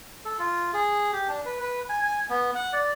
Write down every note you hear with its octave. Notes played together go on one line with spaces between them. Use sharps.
A4
F4
G#4
G4
D4
B4
B4
G#5
G#5
B3
F#5
D5